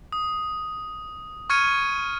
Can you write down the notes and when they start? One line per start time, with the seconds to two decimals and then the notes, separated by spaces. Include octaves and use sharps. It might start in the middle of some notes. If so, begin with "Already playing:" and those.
0.12 D#6
1.50 C#6 F6 G#6 C#7 D#7